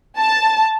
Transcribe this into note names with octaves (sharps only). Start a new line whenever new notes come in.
A5